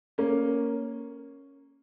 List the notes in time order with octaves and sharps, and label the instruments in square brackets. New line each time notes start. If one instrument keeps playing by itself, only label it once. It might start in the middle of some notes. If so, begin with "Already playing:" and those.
[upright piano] A#3 C#4